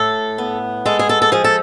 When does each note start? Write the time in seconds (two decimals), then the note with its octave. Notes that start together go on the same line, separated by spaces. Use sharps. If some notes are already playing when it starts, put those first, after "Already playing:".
Already playing: A2 A4
0.38 B3
0.86 G#3 A4
0.99 G#4
1.09 A4
1.22 A4
1.32 F3 G#4
1.44 A4